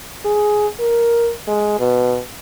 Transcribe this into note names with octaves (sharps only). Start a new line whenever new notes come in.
G#4
A#4
G#3
B2